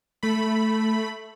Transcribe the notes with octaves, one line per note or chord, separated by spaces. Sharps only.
A3 B5